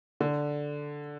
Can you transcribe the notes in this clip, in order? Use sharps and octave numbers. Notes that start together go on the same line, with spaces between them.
D3